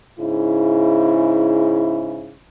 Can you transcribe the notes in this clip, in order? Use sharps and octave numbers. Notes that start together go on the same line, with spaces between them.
G#2 C#3 E4